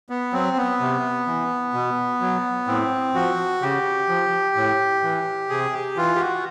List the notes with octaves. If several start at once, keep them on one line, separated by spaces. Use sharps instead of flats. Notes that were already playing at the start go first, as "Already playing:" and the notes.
B3
F#3 C4
B3
C3
E3
B2
F#3
A2 C4
F3 F#4
C#3 G4
F3
A2
E3
C3 G#4
G4
E3 F4
G4
F#4